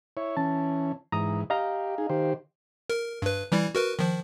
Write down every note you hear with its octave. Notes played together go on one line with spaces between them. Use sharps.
E4 C#5
E3 C#4 A5
G#2 E3 A#5 D#6
G4 D#5 F5 A#5
D#4 G#4
D#3 G4 C5
A#4
G2 B4
E3 G3 E4
F#4 A#4 B4
D#3 F3